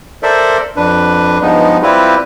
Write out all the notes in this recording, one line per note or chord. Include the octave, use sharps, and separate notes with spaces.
A4 A#4 C5 D5 E5
F2 D4 B4
G2 F3 G#3 B3 D#4
G3 C4 E4 F4 G4 B4